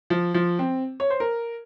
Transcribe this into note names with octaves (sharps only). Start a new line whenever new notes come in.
F3
F3
C4
C#5
C5
A#4